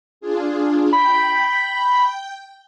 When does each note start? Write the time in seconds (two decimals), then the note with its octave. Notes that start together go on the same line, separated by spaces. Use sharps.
0.21 D4 F4 G#4
0.93 G5 B5 G6